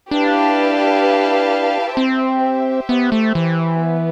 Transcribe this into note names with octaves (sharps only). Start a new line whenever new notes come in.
D4 E4 G4 B4 F5 A5
C4 G4 C5 E5
B3
A3
E3
B3